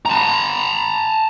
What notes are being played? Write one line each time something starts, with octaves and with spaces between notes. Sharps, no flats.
A5 A#5